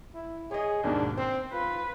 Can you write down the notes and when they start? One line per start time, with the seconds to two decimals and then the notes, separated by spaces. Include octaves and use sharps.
0.15 E4
0.51 G#4 C#5 D#5
0.84 D#2 G#2 B2 D4
1.17 C4 C5
1.53 F4 B4